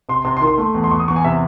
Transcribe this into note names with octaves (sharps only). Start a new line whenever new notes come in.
C3 C6
C3 C6
C6
D#3
C6
A3 C6
E2
C6
E2 C#6
D#6
E2 C#6
G#5
C3 E5